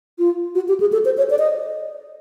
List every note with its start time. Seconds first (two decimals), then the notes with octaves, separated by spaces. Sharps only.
0.19 F4
0.55 F#4
0.68 G4
0.80 G#4
0.92 A4
1.05 C5
1.18 C#5
1.30 D5
1.39 D#5